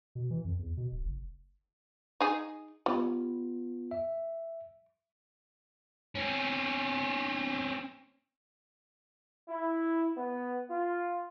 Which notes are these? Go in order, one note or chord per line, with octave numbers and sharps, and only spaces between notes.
B2
E3
F2
E2
B2
D1
F#1
D#4 G#4
G3 B3 F4
E5
C4 C#4
E4
B3
F4